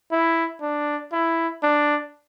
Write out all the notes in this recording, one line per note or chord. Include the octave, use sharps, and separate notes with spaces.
E4
D4
E4
D4